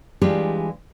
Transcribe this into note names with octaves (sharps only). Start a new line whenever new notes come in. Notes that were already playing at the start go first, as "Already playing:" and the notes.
E3 G3 G#3 D4 F4 G4